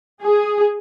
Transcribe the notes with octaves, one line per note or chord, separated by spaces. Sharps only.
G#4